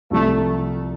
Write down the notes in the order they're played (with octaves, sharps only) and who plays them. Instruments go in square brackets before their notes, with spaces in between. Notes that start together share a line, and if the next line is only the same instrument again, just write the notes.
[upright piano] C2 C3 F3 [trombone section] A3